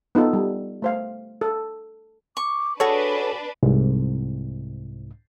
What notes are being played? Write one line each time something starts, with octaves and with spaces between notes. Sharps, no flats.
B3 D#4 F4 A4
G3
A3 C5 F5
A4
C#6 D6
D4 F#4 G#4 A4 B4 C#5 F#5
C2 G#2